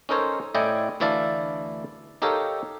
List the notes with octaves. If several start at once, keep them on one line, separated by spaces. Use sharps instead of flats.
C#4 D#4 A4 A#4 C5 C#5
A2 E4 D5 D#5 G5 G#5
D2 E3 E4 D5 F5 A5
D#4 G4 A4 A#4 C#5 F5